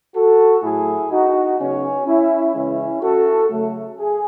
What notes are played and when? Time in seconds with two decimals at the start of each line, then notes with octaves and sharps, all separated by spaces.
0.15 F#4 A4
0.62 A2 F#3 A3 E4 G#4
1.11 D#4 F#4
1.59 C#3 F#3 B3 C#4
2.06 C#4 E4
2.54 C#3 E3 G#3 C#4 E4
3.02 F#4 A4
3.50 C#3 F#3 A3
3.98 G#4